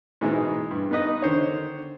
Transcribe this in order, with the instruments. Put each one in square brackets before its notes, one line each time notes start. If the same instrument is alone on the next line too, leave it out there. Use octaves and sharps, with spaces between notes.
[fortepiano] G#2 B2 E3 G#3
G2
B3 D#4 B4 D#5
D3 D#3 C5 C#5